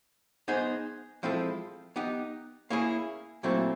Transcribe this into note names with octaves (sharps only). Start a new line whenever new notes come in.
B3 D#4 G#4 C5
F3 G#3 C4 E4 A4
B3 D#4 G4
A#3 C#4 E4 G#4
A#2 F#3 A3 C4 E4